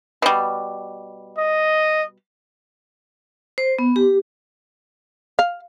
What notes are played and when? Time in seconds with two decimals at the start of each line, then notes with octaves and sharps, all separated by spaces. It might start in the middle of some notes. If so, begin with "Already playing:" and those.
0.22 B2 G3
1.38 D#5
3.58 C5
3.79 B3
3.96 G4
5.39 F5